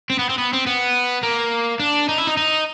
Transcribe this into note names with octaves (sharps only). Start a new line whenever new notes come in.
C4
B3
C4
B3
C4
B3
A#3
D4
D#4
E4
D#4
D#4